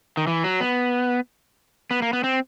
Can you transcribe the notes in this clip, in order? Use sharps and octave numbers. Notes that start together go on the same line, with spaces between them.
D#3
E3
F#3
B3
B3
A#3
B3
C4